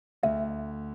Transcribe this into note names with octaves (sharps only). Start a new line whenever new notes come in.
D2 E5